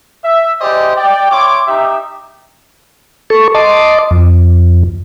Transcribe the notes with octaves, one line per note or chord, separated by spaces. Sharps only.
E5
E4 G4 G#4 C5 D5 D#5
D5 G5
E4 C#5 C6 D6
D#4 G4 E5
A4 C#6
D#5 A5 C6 D6
F2